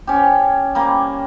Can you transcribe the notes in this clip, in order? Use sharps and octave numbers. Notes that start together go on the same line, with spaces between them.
C#4 G4
G3 A#3